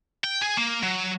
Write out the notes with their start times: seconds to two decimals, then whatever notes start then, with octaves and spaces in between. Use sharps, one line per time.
0.24 G5
0.41 G#4
0.57 A#3
0.83 F#3